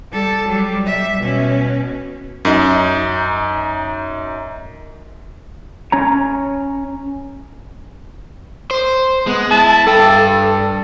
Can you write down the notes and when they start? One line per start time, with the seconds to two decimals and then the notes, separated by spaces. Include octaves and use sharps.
0.11 G3 A4
0.47 F#3 G3
0.86 G3 E5
1.20 B2 C#4
2.45 F#2 D#4
5.92 C#4 C#5 A#5
8.71 C5
9.27 G#3 B3
9.51 E4 A5
9.87 G2 A4 G5
10.11 A4